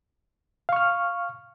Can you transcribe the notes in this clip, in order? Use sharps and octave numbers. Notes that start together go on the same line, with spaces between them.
F5 C#6 F6